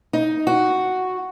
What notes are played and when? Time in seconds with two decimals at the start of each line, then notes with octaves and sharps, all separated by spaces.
0.13 D#4
0.47 F#4